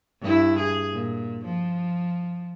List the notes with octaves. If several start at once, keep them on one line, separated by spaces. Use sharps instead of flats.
G2 E4
G#4
A#2
F3